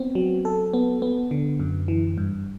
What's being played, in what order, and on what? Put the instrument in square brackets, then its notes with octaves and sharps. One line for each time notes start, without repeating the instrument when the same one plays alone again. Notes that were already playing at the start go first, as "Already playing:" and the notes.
Already playing: [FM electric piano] B3 C4
F#3
A4
B3
B3
D3
F#2
E3
G2